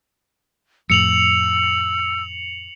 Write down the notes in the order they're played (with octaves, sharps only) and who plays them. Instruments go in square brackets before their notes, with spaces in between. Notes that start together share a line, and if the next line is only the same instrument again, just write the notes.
[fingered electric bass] F2 A2 [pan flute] E6 [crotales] C#7 F7 F#7